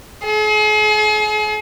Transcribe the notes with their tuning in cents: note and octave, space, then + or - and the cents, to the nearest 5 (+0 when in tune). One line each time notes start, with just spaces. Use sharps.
G#4 +40